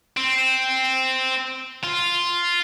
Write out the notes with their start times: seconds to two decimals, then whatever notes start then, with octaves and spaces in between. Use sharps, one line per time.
0.17 C4
1.84 F4